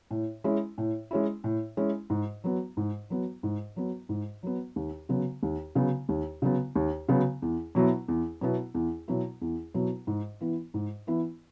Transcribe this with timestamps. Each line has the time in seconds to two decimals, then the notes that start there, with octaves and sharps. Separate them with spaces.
0.11 A2
0.44 G#3 C#4 E4
0.78 A2
1.11 G#3 C#4 E4
1.44 A2
1.77 G#3 C#4 E4
2.10 G#2
2.44 F#3 B3
2.77 G#2
3.10 F#3 B3
3.43 G#2
3.76 F#3 B3
4.09 G#2
4.43 F#3 B3
4.76 D#2
5.09 C#3 F#3 B3
5.43 D#2
5.75 C#3 F#3 B3
6.09 D#2
6.42 C#3 F#3 B3
6.75 D#2
7.09 C#3 F#3 B3
7.42 E2
7.75 B2 F#3 B3 E4
8.08 E2
8.41 B2 F#3 B3 E4
8.74 E2
9.08 B2 F#3 B3 E4
9.41 E2
9.74 B2 F#3 B3 E4
10.07 G#2
10.41 E3 B3 E4
10.74 G#2
11.07 E3 B3 E4